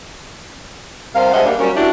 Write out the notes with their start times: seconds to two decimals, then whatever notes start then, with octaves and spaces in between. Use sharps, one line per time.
1.15 C3 G3 A#4 C5 F5
1.33 G2 G#3 C5 D#5 E5 F#5
1.45 G3 A#3 D4
1.59 F#3 G3 C#4 A#4
1.75 D2 D4 E4 F#4 G4